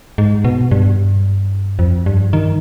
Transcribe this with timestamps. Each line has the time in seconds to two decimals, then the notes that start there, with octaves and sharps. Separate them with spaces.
0.18 G#2
0.44 B2
0.71 G2
1.79 F2
2.06 G2
2.33 D#3